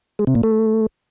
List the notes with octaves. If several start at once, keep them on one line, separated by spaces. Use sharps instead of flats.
G#3
C3
A#2
A3